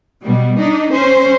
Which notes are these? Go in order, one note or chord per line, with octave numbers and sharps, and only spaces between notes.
B2 G3
D4 D#4
C#4 C5